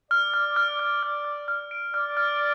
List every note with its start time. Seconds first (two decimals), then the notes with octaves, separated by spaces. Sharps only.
0.10 D5 F6
0.34 F6
0.56 F6
0.79 F6
1.03 F6
1.25 F6
1.48 F6
1.71 D7
1.94 D5 F6
2.17 F6